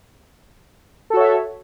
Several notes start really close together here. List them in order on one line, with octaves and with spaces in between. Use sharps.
A4 F#4 C#5 E5